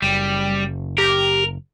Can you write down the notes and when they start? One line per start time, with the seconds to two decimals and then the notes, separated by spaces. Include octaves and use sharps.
0.02 F#1 G3
0.98 G4 A#4